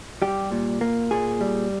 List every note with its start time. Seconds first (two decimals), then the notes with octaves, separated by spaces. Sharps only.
0.22 G3 G4
0.52 A#2
0.81 A#3
1.11 A#2 G#4
1.41 G3